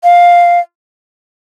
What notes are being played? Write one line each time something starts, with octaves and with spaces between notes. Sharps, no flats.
F5